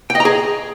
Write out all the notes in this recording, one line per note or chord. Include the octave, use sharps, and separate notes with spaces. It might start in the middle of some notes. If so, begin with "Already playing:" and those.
G5
D#5
A#5
G#4